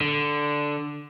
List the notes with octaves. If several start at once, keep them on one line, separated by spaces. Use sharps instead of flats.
D3